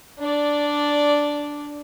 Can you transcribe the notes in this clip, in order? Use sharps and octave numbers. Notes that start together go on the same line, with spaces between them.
D4 D5